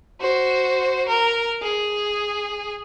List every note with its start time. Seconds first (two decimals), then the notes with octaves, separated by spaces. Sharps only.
0.21 F#4 C5
1.09 A#4
1.63 G#4